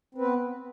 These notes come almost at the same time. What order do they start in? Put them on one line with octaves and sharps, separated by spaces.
C4 B4 B3